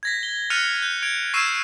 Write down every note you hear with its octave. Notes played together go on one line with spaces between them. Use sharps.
G#6 A#6 B6
G7
F6 F#6 A6 C#7 D#7 F7
G6
G#6 D7 F7
C#6 E6 G#6 C7 D#7 E7